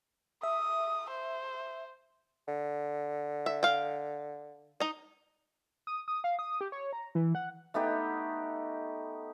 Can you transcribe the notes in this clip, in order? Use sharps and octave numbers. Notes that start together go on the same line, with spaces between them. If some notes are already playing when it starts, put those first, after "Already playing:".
E5 D#6
C5
D3
E5
F5 G5
D#4 D#5
D#6
D#6
F5
D#6
G4
C#5
A#5
E3
F#5
A3 B3 D#4 G4